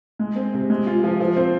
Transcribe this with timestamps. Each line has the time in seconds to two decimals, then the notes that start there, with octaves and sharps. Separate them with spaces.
0.19 G#3
0.36 C4
0.54 C3
0.70 G#3
0.87 F4
1.04 F3
1.20 F3
1.37 C4